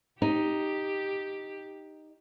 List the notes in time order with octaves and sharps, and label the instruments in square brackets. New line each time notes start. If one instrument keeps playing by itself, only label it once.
[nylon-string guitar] D#4 [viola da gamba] G4